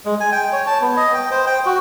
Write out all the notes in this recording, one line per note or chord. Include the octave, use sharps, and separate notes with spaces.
G#3
G#5
G5
C#5
A5
B3
D#5
G5
C5
G5
F#4